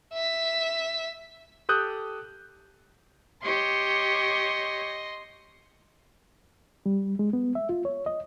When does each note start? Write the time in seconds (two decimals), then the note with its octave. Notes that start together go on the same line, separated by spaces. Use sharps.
0.13 E5 B6
1.69 G4 A4 D#6 F#6 G6
3.43 G4 C#5 D#5 C6
6.86 G3
7.19 G#3
7.33 B3
7.55 E5
7.69 F4
7.85 C#5
8.06 D#5